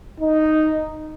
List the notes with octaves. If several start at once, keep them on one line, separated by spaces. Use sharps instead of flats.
D#4